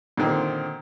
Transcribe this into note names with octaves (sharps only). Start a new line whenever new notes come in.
A#2 D3 D#3 C4